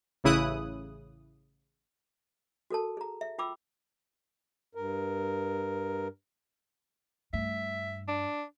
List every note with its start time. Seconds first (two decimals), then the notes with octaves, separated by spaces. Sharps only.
0.24 A1 C#3 E4 D#6 F#6
2.70 F#4 A4 A#4 A5
2.97 G#4 A#5
3.21 E5
3.38 F4 G5 B5 D6 E6
4.75 G2 A#4
7.33 G2 A3 E5
8.08 D4